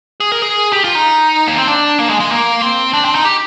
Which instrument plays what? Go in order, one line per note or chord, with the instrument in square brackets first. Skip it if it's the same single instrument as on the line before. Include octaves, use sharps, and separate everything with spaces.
[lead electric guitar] G#4
A#4
G#4
G4
F4
D#4
A#3
C4
D4
A#3
G#3
G#3
A#3
C4
D4
C4
D#4
G4